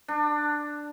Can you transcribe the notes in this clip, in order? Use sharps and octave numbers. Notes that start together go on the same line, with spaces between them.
D4